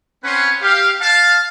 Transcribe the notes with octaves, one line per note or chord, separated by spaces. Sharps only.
C4 C#4 B4 C#5 F#5 C6
G4 F5
F5 A5